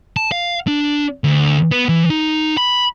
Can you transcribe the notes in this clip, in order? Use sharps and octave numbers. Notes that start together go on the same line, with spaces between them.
A5
F5
D4
D2
B3
E3
D#4
B5